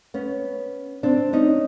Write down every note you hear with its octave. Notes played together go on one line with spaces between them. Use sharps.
B3 C#4
C4 D4
C#4 D#4